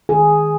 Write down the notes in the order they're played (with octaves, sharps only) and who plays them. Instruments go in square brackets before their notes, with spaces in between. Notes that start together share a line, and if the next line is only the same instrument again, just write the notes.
[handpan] D#3 G#4